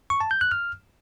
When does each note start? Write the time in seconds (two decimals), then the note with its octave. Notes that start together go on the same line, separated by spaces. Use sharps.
0.10 C#6
0.20 A5
0.31 G6
0.41 F#6
0.51 F6